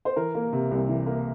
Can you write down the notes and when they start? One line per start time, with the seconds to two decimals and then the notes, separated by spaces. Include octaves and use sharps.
0.05 C5
0.16 E3 A#4
0.35 A#3
0.53 C3
0.71 C2
0.89 E3
1.06 A#3